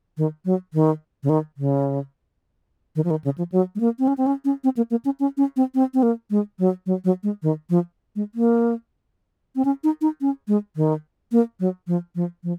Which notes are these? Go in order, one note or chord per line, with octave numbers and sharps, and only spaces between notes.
D#3
F#3
D#3
C#3
D#3
C#3
D#3
F3
D#3
C#3
F3
F#3
G#3
A#3
C4
C#4
C4
C#4
C#4
C4
A#3
A#3
C#4
C#4
C#4
C4
C4
C4
A#3
G#3
F#3
F#3
F#3
G#3
D#3
F3
G#3
A#3
C4
C#4
D#4
D#4
C#4
G#3
D#3
A#3
F#3
F3
F3
F3